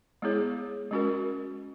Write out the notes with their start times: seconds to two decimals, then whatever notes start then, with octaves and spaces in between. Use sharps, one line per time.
0.22 G#3 B3 E4 G#4 C#5
0.91 G#3 C#4 F#4 A#4